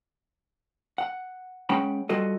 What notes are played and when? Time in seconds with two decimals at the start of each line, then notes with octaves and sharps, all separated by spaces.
0.98 F#5
1.69 G#3 C#4 F#5 G5 B5
2.09 G3 F4 F#4 A4 D#5